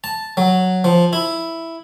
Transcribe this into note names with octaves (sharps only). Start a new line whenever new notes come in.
A5
F#3
F3
E4